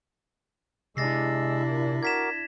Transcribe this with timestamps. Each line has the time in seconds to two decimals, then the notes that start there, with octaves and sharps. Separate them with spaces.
0.97 C3 G#3 D4 E4 E6 A6 A#6 C7
1.65 A#2
2.03 F#4 A#4 D6 G#6 B6 E7